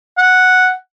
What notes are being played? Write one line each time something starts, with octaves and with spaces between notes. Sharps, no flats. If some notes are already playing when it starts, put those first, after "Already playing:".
F#5